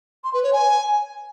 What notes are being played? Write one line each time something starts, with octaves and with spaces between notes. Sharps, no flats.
C6
B4
C#5
G#5